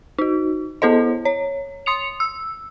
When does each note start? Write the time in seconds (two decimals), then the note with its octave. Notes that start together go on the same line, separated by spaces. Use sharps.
0.18 D#4 F#4
0.82 B3 E4 A4 C5 D#5
1.25 C#5
1.86 C6 D#6 C#7 F7
2.20 E6